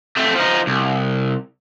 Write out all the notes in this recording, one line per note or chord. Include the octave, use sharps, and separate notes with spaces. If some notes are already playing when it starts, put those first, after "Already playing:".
A3 C4
F3 D#4
C2